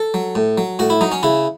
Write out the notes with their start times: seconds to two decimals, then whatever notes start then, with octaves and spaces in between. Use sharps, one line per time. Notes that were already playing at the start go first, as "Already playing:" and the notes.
Already playing: A4
0.14 F#3
0.35 A2
0.58 F#3
0.79 A2 F#4
0.90 E4
1.01 F#3 D#4
1.12 C#4
1.23 C#3 E4